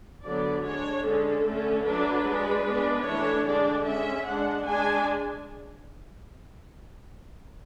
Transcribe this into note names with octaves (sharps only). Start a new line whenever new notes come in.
D3 F#3 B3 D5
G#3 D4 C#5
D3 G#3 C#4 A4
D3 A3 C#4
F#3 A3 D4 B4
G#3 D4
G#3 B3 D4
E3 A3 D4 C#5
D3 G#3 D4 D5
G#3 C#4 E5
G#3 D4 F#5
G#3 D4 G#5